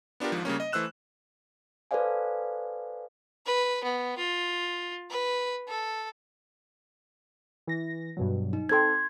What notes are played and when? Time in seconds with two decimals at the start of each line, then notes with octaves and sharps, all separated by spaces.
0.20 B3 D4 F4 G4 A#4
0.32 G#1 G#2 F3
0.45 C#3 G3 A#3 C#4
0.60 D#5
0.72 E3 A3 C5 E6 F#6 E7
1.91 A4 B4 C5 D5 F5 G#5
3.46 B4
3.84 B3
4.17 F4
5.10 B4
5.68 A4
7.67 E3 A#6
8.17 G2 B2 F#3
8.53 D#4
8.69 C4 A4 G5 C6 G#6